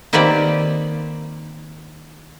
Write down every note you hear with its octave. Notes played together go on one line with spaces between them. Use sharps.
D#3 A#3 C4 G4 B4 D5